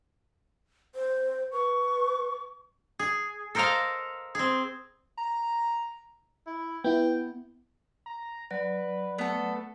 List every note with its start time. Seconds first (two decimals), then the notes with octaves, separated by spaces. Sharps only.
0.95 C5
1.52 B4 C#6
2.99 G#4
3.55 A4 A#4 C5 D#5 F5 A#5
4.35 C4 G#4
5.18 A#5
6.47 E4
6.84 B3 E4 G5
8.06 A#5
8.51 F#3 B4 D5
9.18 A3 B3 A4